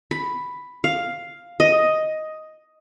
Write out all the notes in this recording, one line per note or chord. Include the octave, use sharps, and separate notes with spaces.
B5
F5
D#5